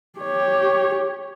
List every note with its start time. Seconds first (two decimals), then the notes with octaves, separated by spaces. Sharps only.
0.20 G4 C#5